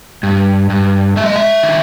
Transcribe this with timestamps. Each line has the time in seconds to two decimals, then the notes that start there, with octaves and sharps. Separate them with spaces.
0.23 G2
0.70 G2
1.17 G#3 E5
1.26 D#5
1.36 E5
1.63 D#3